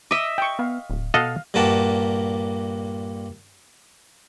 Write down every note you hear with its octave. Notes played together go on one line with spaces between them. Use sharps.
D#5 E5 D6
G5 C#6
B3 F5
D1
B2 A4 D#5 F5 F#5
G2 A#2 A#3 F#4 G4 A5